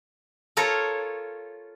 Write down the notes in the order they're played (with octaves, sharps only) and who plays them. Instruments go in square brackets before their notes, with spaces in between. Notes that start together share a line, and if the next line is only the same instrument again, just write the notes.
[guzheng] F4 A4 A#4 C#5